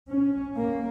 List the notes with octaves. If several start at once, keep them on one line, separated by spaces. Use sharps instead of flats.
C#4
A#3